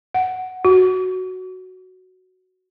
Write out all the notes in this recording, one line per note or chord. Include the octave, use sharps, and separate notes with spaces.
F#5
F#4